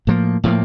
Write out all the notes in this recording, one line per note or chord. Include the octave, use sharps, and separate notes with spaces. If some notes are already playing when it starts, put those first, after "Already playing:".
A2 F3 A#3
A2 F3 A#3